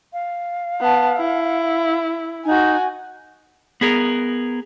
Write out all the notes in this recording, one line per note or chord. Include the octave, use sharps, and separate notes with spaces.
F5
B3 A5
E4
D#4 F#4 G#5
B3 G#4 A#4